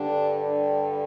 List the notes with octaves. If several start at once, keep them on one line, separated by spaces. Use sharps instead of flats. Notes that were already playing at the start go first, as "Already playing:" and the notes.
Already playing: G2 D3 G3 D4